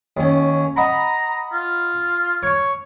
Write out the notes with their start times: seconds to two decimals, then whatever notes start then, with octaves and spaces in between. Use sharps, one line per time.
0.17 D#2 C#4
0.76 D#5 F#5 A#5 B5
1.53 F4
2.43 C#5 C#6